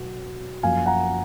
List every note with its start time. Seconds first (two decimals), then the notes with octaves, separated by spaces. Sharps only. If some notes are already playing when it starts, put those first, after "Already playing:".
Already playing: B2 F#3
0.63 F#2 F3 A#3 F5 G#5
0.86 F#5 A#5